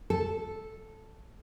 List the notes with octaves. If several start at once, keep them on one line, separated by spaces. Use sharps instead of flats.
A4